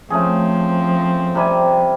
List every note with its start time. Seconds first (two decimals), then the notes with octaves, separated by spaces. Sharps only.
0.10 F3 A3 C4 C#4 G#4
1.35 C3 G3 G#5